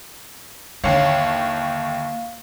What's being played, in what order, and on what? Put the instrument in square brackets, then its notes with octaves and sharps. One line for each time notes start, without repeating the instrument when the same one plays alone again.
[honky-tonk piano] G1 D#2 [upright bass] A#3 [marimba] C#5 [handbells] F5